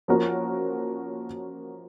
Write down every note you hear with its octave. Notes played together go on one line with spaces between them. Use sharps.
F3 A#3 C#4 F#4 A#4